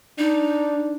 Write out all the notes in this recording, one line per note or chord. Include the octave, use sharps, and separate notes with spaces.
D4 D#4